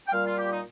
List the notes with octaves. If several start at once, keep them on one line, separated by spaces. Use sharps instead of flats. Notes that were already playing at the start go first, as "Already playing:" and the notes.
G5
A#2 G3 F5
F4
G4
D#4